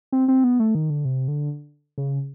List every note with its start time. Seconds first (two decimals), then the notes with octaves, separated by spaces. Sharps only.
0.12 C4
0.28 C4
0.44 B3
0.60 A3
0.75 D#3
0.90 D3
1.05 C3
1.28 D3
1.98 C#3